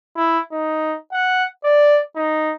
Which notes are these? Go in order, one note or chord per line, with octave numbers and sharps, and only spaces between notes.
E4
D#4
F#5
D5
D#4